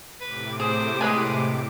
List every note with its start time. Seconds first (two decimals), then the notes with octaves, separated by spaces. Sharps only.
0.20 A2 C3 B4 D6
0.60 G#4 C5
1.01 G#3 G#4 B4 G#5